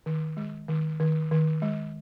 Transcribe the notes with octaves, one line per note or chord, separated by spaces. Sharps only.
D#3
G#3
D#3
D#3
D#3
G#3